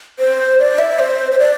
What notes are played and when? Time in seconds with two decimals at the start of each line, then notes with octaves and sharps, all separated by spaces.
0.19 C5
0.59 D5
0.79 E5
0.99 C5
1.32 C5
1.39 D5